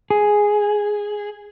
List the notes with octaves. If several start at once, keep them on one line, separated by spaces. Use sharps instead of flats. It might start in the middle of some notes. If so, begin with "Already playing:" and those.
G#4